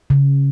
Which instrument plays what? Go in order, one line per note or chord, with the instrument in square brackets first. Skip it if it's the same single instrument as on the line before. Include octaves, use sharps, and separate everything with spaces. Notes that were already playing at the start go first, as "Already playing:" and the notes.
[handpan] C#3